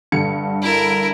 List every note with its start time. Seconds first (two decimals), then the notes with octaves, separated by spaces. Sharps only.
0.12 G2 D3 C#7
0.62 E4 A#4